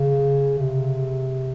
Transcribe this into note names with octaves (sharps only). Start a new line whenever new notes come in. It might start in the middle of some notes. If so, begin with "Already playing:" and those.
Already playing: C#3
C3